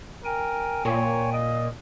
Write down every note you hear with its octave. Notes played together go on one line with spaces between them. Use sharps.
A#4 G5 G#5
A#2 C#5
D#5